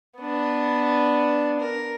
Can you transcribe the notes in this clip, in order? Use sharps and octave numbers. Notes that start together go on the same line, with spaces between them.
B3 D4
A#4